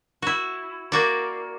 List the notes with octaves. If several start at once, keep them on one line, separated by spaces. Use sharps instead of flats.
E4 F#4
A#3 F#4 D5